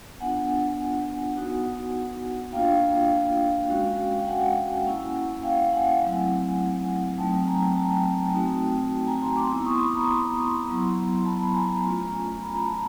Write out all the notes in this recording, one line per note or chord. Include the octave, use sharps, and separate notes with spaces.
B3 D4 F4 F#5 G#5
B3 D#4 F#4
A#3 D4 F4 F5 G5
G#3 C#4 F#4
G5
F#5 G#5
A#3 C#4 E4
F5 G5
F#5 G#5
F#3 A3 C4 E4
F#3 A3 C4 D#4 G5 A5
G#5 A#5
G5 A5
A3 C4 D#4 F#4
G#5 A#5
A#5 C6
C6 D6
B3 E4 C6 D6
C#6 D#6
B5 C#6
A#5 C6
F#3 B3 E4
A5 B5
G#5 A#5
A3 C#4 F4
B5
A#5
A5